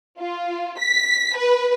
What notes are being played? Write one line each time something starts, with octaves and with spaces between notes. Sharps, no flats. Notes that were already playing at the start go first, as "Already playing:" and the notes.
F4
B6
B4